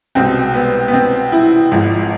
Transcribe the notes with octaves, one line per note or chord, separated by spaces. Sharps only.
C2 B2 G#3 C4
B3
B3
C4
E4
G#1 G#2 F3 G#3